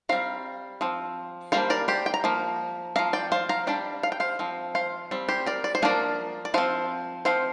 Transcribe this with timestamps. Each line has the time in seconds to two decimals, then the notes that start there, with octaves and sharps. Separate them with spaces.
0.09 G3 C4 F5 A#5
0.81 F3 C4
1.52 G3 A#3 D4 C5 F5
1.70 A#4 D5
1.88 G4 C5
2.06 G5
2.14 A#5
2.24 F3 A#3
2.96 F3 D4 F5 A#5
3.13 D5 G5
3.32 C5 F5
3.49 F5 A#5
3.67 G3 D4 D5 G5
4.03 F5
4.12 G5
4.20 C5 F5
4.39 F3 C4
4.75 C5 F5
5.11 G3 C4
5.29 G4 C5
5.46 A#4 D5
5.64 D5
5.75 C5
5.82 F3 A#3 D4 A#4 D5
6.45 D5
6.54 F3 C4 C5 F5
7.25 F3 C4 C5 F5